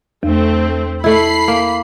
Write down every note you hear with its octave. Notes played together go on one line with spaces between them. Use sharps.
E2 A3 C4
A3 E4 B5 C7
A#3